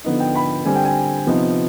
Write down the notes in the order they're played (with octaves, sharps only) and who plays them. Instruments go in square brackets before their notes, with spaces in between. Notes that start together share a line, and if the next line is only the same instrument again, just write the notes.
[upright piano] D3 F3 B3 D#4
G5
B5
D3 G3 C4 G#5
G5
G#5
C3 F3 B3 D#4